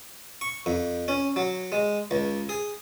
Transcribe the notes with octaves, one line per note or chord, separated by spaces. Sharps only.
C#6
F2
C#4
F#3
G#3
C#2
G#4